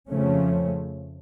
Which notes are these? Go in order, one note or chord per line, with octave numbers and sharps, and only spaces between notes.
F2 C#3 F3 A3 C#4